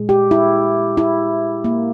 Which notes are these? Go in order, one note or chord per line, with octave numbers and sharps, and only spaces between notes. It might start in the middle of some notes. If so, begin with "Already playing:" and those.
Already playing: A#2 G#3
G4
E4
E4
A#3